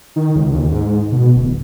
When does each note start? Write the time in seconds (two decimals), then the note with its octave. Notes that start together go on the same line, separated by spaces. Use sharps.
0.16 D#3
0.36 C#2
0.53 D#2
0.72 G#2
1.12 B2
1.36 D1